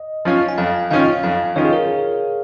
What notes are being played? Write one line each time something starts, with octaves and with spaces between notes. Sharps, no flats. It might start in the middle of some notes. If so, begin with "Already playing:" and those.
Already playing: D#5
F3 C#4 F4
G#5
F2 F5
D#3 C#4 F4 F5
F2 F5
D#3 C#4 F4 C#5
G#4
A#4